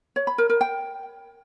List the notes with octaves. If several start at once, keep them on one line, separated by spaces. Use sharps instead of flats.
C#5
B5
A#4
A#4
G5